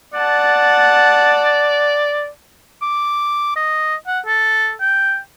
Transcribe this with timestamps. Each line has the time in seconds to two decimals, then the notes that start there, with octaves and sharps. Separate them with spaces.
0.14 D5 F#5 A5
2.82 D6
3.56 D#5
4.07 F#5
4.26 A4
4.80 G5